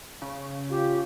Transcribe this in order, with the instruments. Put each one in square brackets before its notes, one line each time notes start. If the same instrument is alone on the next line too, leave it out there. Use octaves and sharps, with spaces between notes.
[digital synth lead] C#3
[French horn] F4 [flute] G4